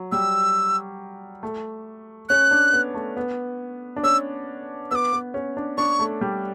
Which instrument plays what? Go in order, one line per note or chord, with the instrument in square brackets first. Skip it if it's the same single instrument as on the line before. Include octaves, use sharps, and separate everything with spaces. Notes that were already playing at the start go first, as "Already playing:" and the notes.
Already playing: [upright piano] F#3
[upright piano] G3 [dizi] E6
[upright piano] A3
[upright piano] C#4 [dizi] F#6
[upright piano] D4
B3
A3
B3
D4
[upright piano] C#4 [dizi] E6
[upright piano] B3 [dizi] D6 E6
[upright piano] B3
C#4
D4
[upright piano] D4 [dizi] C#6
[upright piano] A3
G3